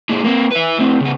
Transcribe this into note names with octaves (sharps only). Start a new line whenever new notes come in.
A#2 G#3
A#3 C4
B4 E5
A2 C4
C#3 B3